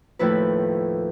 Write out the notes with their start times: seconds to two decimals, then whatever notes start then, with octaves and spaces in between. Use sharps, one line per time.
0.19 D#2 A2 F3 E4 B4